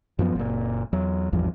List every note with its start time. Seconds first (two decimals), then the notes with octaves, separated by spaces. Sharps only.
0.19 F#2 F3 B3
0.35 F#1 A#2
0.93 E2 F#3
1.32 A1 E2 G2 F3